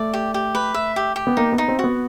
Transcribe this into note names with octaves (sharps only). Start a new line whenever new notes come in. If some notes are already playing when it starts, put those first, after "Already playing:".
Already playing: A3 D5
G4
G4
B4
E5
G4
G4
B3
A#3 D#4
B3
D#4
C4
F#4
B3